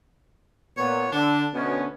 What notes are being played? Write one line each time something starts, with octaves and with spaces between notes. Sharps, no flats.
A#2 B3 C#5
D3 D4
D2 B2 B3 C#4